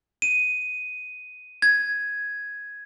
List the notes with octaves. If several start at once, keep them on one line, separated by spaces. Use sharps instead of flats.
D#7
G#6